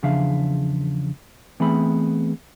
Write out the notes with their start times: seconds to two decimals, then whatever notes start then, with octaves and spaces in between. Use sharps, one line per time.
0.03 E2 C#3 F3 D4 E5 F5
1.60 E3 A3 B3 C4 G#4 B5